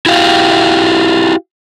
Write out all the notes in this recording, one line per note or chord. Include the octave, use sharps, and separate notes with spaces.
E4 F#4 G4 F5